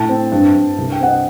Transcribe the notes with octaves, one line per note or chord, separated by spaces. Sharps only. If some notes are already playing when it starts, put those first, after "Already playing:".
Already playing: A2 A5
C4
G2
G2
C2
G5
C4 F#5
D#5